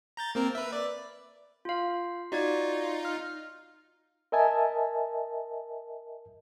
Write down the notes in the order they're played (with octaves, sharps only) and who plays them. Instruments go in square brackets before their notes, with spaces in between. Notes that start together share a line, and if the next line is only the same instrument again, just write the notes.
[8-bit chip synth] A#5 G6 A6
A#3 C4 A#4
B4 E5
D5
[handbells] F4 F5
[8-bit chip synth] D#4 F4 [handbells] F#4 D5 G#6
[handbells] F6
[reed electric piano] A#4 D#5 E5 G#5 A5